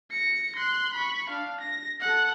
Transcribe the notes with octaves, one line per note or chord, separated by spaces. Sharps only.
A#6 C#7
C6 F#6
B5 C#6
D4 F5
A#6
A4 F#5